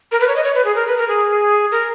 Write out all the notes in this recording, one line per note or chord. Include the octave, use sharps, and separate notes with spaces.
A#4
B4
C#5
D#5
C#5
B4
G#4
A#4
B4
A#4
G#4
A#4